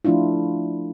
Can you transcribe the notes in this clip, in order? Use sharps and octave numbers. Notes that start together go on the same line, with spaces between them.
F3 A3 D4 E4 F4